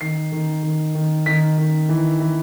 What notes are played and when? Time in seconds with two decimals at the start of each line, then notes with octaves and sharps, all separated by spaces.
0.01 D#3 C7
0.32 D#3
0.63 D#3
0.95 D#3
1.26 D#3 B6
1.57 D#3
1.89 E3
2.20 E3